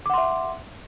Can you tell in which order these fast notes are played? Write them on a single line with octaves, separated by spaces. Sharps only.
D6 F#5 C6 E5